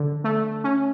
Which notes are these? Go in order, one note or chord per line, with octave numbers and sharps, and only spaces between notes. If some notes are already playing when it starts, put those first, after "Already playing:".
Already playing: D3
A3
C#4